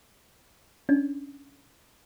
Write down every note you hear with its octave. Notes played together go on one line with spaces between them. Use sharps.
C#4 D4